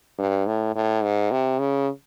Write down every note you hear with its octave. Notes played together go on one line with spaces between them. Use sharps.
G2
A2
A2
G#2
C3
C#3